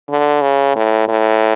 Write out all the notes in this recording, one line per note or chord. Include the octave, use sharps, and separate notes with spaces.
D3
C#3
A2
A2